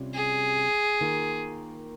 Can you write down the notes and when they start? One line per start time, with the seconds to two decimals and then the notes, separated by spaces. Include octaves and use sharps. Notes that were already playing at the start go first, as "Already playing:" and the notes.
Already playing: C3 G3 C#4 F4
0.14 G#4
1.01 D#3 A#3 F4